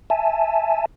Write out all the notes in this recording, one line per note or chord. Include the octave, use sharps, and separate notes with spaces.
E5 G#5 A5